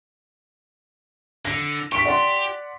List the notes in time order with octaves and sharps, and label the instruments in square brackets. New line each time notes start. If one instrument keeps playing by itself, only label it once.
[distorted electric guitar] D3 [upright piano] A#6
[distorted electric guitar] G4 [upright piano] C#6 B6
[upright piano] D5 F#5 C6